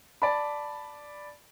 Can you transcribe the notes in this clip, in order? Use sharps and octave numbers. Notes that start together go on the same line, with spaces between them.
D5 A5 B5